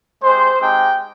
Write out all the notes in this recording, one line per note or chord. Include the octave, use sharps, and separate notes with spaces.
G#3 C4 G4 C5
G#3 C4 D#4 G4 G5